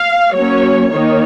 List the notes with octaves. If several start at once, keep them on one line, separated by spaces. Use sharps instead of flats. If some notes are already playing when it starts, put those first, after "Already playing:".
Already playing: F5
F#3 A#3 C#4 C#5
D#3 A#3 D#4 C#5